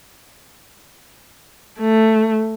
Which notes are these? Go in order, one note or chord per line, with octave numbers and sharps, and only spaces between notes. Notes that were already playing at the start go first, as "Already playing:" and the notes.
A3